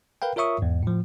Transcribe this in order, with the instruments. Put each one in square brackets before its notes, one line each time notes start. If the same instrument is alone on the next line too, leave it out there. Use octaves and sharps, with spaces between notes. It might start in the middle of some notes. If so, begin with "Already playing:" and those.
[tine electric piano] A#4 B4 F5 G5
F4 A#4 C#5 E5 C#6 D#6
E2 G#2
A2 F3